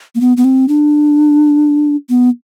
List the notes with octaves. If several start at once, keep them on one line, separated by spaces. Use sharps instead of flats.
A#3
B3
B3
C4
D4
B3